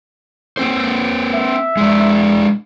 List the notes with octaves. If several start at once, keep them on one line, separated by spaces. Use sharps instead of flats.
A#3 C4 C5
E5
G#3 D4